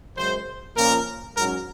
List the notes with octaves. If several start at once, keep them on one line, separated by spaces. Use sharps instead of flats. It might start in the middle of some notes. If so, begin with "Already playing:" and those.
F#2 C#3 G#3 C5
A#2 F3 A#3 C#4 A#4
G#2 F#3 C#4 A#4